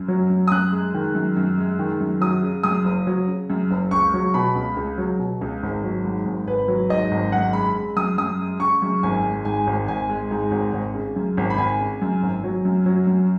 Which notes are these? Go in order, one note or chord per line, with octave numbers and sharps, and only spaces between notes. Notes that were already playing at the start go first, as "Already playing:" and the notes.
Already playing: F#2
F#3
F#2
D#6
F#2 F#6
G#3
D#3
F#2
F#2
G#3
D#3
F#2
F#3 D#6
C#3
F#2 D#6
F#1
F#3
C#3
F#2
F#1
C#2 C#6
F#3
B2 B5
C#2
C#2
F#3
B2
C#2
G#1
F#3
G#2
G#1
G#1 B4
F#3
G#2 D#5
G#1
F#2 F#5
G#3 B5
C#3
F#2 D#6
F#2 D#6
G#3
C#3 C#6
F#2
G#1 G#5
G#3
G#2 G#5
G#1
G#1 G#5
G#3
G#2
G#1
G#1
C#3
F#2
G#1
B5
G#1 G#5
C#3
F#2
G#1
F#3
F#2
F#3
F#2